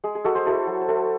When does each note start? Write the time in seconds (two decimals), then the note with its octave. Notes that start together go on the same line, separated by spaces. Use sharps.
0.04 G#3 G#4
0.15 G#4
0.24 G#3 F#4 A4
0.35 G#4 C5
0.46 E4 F#4 A4
0.67 F#3
0.81 C5
0.88 E4 F#4 A4